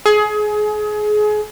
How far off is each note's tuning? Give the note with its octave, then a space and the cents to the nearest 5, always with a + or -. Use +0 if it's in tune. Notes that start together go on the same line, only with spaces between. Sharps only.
G#4 +25